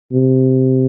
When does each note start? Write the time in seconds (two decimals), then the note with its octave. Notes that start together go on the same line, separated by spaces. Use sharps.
0.13 C3